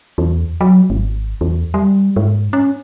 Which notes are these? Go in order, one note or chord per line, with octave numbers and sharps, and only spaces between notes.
E2
F#3
G#1
E2
G3
G#2
C#4